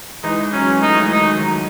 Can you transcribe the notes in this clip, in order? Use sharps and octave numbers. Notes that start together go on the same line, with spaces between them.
E3 G#3 D#4
F#3 C#4
G#3
F#3 A3 D#4
E3 G#3
D#4
D#3 F#3
D#3 F#3